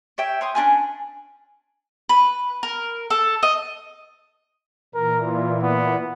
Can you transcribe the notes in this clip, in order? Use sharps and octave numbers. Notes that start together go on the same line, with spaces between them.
C#5 E5 G5
C#5 C6 D#6
C#4 D4 F4 G#5
B4
A#4
A4
D#5
A#2 E3 A#4
F4
B3